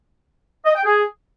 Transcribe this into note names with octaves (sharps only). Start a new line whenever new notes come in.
D#5
G5
G#4